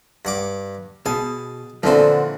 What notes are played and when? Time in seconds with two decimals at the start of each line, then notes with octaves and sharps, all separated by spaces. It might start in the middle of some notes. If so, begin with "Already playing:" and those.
0.25 G2 F#5 D6
1.06 B2 G#4 A5
1.83 A#2 D3 E3 F3 C4 F#4 C5